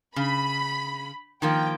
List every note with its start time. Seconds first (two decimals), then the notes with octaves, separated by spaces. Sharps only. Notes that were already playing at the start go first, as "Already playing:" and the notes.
0.16 C#3 B5
1.42 D#3 F3 A#3 G5